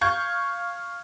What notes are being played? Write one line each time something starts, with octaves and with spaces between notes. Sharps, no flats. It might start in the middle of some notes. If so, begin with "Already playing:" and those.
F5 C#6 G6 G#6